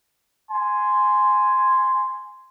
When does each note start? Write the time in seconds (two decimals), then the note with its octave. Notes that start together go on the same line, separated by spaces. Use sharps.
0.49 G#5 C6